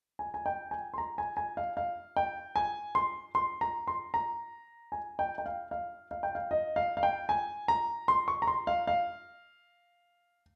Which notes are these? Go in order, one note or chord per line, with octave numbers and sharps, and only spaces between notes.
G#5
G#5
G5
G#5
C6
A#5
G#5
G#5
F5
F5
G5
G#5
C6
C6
A#5
C6
A#5
G#5
G5
G5
F5
F5
F5
G5
F5
D#5
F5
F5
G5
G#5
A#5
C6
C#6
A#5
C6
F5
F5